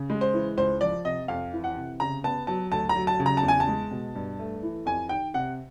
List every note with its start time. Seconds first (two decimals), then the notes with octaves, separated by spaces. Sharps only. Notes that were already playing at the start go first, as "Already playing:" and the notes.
Already playing: C#3
0.10 G#3
0.21 C5
0.34 E3
0.57 C#2 C5
0.81 F3 D5
1.05 C3 D#5
1.28 F2 F5
1.53 E3
1.64 F#5
1.76 C3
2.00 C#3 A#5
2.24 B3 A5
2.47 F#3 A5
2.71 D2 A5
2.89 A#5
2.96 F#3
3.07 A5
3.20 C#3
3.26 A#5
3.37 A5
3.43 E2
3.48 G#5
3.60 A5
3.68 G#3
3.91 B2
4.15 G2
4.39 A3
4.63 E3
4.86 F2 G#5
5.09 D#3 G5
5.34 C3 F#5